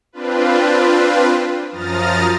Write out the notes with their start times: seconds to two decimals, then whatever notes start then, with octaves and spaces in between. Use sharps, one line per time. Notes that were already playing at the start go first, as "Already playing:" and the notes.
0.12 C4 D4 F4 B4
1.71 F#2 F3 A#5 D#6 F6 A6